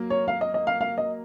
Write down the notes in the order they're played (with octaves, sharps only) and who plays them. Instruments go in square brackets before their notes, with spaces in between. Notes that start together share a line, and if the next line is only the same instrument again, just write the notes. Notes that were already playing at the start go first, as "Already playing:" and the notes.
Already playing: [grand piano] F#3 A#3
[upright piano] C#5
F5
D#5
D#5
F5
F5
D#5